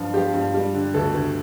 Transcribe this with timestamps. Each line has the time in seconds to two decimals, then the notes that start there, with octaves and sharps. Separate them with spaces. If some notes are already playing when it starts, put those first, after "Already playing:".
Already playing: G2 F3 F4
0.14 F3 G4
0.34 G2
0.54 G3
0.74 D3
0.94 D2 A4
1.14 D2